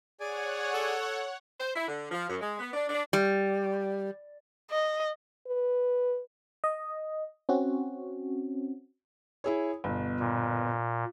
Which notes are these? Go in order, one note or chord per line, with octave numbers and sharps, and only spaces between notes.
G#4 C#5 D5 F#5 G#5
A4
C5
E4
D3
F3
F#2
G#3
B3
D4
D4
G3
D#5
B4
D#5
C4 C#4 F#4
E4 G#4 C#5
G1 B2
A#2